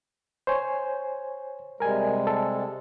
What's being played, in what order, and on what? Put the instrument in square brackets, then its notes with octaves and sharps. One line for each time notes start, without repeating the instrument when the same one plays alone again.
[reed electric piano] C5 C#5 G#5
[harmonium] C3 G3 G#3 [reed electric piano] A#4 G#5
[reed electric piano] A4